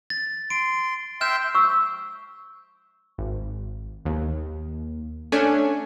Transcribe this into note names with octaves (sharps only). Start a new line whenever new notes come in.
A6
C6 D7
E5 G5 C6 F6 G6 E7
C#6 E6
G#1
D#2
A3 C#4 D4 G#5